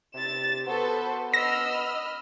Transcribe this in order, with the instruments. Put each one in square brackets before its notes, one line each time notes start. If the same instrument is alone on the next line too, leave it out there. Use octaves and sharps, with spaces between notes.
[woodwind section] C3 [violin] A6 E7
[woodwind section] B3 [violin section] F#4 A4 B4 [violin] C5
[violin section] D#5 B5 F6 [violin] E6 [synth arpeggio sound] A#6